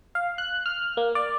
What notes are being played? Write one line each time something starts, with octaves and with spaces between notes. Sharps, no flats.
F5
F#6
F6
A#3
D5